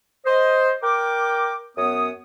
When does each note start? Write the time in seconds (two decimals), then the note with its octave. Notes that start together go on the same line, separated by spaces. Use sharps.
0.25 C5 D#5
0.82 A#4 G5 D6
1.76 F#2 B3 C#5 D#6